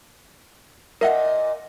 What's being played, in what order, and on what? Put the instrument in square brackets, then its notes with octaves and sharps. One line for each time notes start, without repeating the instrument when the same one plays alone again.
[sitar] A#2 D#5 [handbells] A#4 E5 F#5